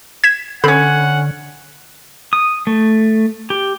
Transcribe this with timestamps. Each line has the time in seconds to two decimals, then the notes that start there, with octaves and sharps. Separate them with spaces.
0.24 G#6 B6 E7
0.64 D3 C4 C#4 F#5 B5
2.33 D#6
2.67 A3
3.50 G4